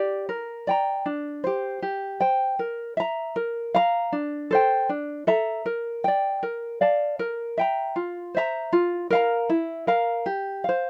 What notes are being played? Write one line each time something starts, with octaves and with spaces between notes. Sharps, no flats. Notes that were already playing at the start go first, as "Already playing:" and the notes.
Already playing: G4 D5
A#4
D5 G5 A#5
D4
G4 C5
G4
C5 G5
A#4
E5 A#5
A#4
F5 A#5
D4
A4 C5 G5
D4
A4 E5 A#5
A#4
D5 G5
A#4
D5 F5 A5
A#4
E5 G5 A#5
F4
C5 E5 A#5
F4
A#4 F5 A#5
E4
A#4 F5 A#5
G4
C5 F5